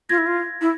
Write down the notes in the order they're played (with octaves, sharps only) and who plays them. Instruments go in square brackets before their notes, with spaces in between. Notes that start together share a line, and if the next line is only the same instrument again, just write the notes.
[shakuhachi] F4 [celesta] G#6 A#6
[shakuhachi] E4
F4
E4